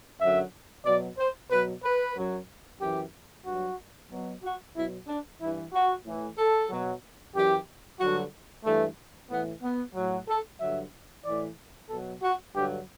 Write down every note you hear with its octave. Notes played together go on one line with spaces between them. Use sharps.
F#2 D3 F#3 E5
B2 F#3 D5
C5
B2 F#3 B4
B4
F#2 F#3
F#2 E3 G4
G2 F#3 F#4
B2 F#3
F#4
B2 F#3 E4
D4
G2 E3 E4
F#4
A2 E3
A4
B2 F#3
F#2 E3 G4
G2 D3 F#3 F#4
G2 E3 A3
A2 E3 B3
B3
A2 F#3
A4
G2 D3 F#3 E5
A2 E3 D5
B2 F#3 A4
F#4
G2 D3 F#3 G4